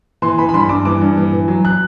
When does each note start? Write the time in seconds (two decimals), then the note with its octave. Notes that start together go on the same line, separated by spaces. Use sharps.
0.22 E3 C6
0.38 E3 B5
0.49 B5
0.54 G2 C6
0.69 G2 D6
0.85 E3 D6
1.01 G2
1.17 E3
1.33 E3
1.48 F#3
1.65 F#6